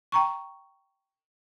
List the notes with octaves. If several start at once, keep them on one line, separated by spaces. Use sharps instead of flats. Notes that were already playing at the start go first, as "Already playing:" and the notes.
G5 A#5 C#6